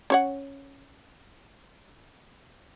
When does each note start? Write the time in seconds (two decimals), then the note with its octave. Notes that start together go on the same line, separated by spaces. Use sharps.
0.10 C#4 C#5 F#5